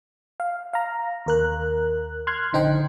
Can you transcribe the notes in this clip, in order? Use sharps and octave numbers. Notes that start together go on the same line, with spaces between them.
F5
F5 A#5
D#2 A#4 F#6
C6 F6 F#6 G#6
A#1 D3 D#4 C5 G5